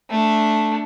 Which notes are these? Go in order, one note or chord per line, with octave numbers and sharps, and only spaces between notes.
A3 D4